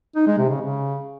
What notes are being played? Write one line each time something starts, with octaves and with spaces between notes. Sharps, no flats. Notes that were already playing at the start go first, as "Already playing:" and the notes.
D#4
G#3
C3
C#3
C#3